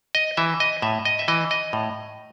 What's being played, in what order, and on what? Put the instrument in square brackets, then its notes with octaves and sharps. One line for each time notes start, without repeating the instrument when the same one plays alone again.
[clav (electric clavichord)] D#5
E3 E5
D#5
A2 E5
D#5
E5
E3 D#5
D#5
A2